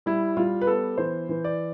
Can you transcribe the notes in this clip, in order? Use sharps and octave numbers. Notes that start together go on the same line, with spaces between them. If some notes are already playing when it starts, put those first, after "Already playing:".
G3 E4
G3 F4
B4
B3 A4
E3 C5
E3
D5